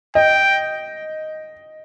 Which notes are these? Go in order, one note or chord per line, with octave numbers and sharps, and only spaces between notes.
D#5 G5